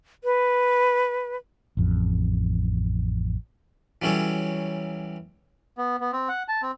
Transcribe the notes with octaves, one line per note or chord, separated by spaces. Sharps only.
B4
A1 F2
E3 F#3 G3 C#4 A4 C#5
B3
B3
C4
F#5
A5
C4